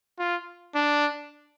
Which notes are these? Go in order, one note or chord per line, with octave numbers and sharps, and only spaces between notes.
F4
D4